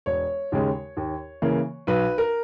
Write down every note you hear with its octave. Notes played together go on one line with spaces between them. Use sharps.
E1 C#5
D#2 C#3 G#3
D#2
C#3 E3 A#3
B1 B4
A#4